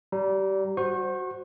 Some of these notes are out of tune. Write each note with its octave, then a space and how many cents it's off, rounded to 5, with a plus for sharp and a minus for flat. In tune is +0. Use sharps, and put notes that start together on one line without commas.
G3 -25 A#5 +0
F#4 +0 C5 +0 C#6 -35